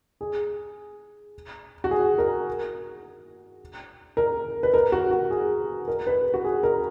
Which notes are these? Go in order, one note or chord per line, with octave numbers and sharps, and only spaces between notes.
G#4
F#4
G#4
A#4
A#4
B4
A#4
F#4
F#4
G#4
A#4
B4
F#4
G#4
A#4